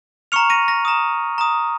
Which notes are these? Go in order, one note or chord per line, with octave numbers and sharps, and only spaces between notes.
A#5 C#6 F6 C#7 F7
A#6 D#7
A#6
A#5 D#6
A#5 D#6